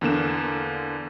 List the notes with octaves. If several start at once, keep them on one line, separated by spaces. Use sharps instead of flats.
E2 D3 A#3 E7